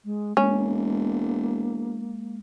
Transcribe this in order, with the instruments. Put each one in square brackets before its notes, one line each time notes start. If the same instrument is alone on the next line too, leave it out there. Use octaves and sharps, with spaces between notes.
[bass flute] G#3
[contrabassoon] E1 [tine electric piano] G#3 [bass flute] A#3 [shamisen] C#4